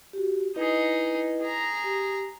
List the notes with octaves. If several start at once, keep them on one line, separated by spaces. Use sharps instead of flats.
F#4 G4
D#4 E4 G#4 B4 D#5
G#4 A#5
G4